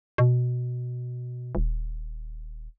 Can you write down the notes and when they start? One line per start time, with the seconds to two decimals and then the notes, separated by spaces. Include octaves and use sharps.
0.18 B2
1.55 D#1